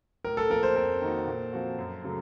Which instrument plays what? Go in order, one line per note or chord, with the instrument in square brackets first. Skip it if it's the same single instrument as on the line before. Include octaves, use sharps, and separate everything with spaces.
[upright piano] A2 [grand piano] A#4
[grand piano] A4
[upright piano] F3 A#3 [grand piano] A#4
[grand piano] C5
[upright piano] F2 [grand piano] A#4
[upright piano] D#3 A#3 D#4 F#4
A#2
F3 C4 F#4
F#2
C#3 F#3 A3